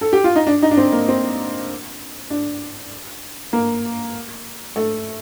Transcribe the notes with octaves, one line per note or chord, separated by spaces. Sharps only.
A4
G4
F4
D#4
D4
D#4
D4
C4
A#3
C4
D4
A#3
A3